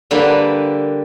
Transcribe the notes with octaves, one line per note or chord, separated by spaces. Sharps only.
D3 G3 A#3 B4